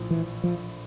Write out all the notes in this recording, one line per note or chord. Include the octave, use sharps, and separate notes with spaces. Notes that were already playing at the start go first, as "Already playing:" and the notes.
Already playing: A#1 A2 F3
E3
F3